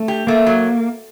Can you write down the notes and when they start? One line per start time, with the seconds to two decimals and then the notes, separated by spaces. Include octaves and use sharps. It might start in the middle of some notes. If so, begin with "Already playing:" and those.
Already playing: A3
0.08 G4
0.27 A3 A#3
0.46 F#3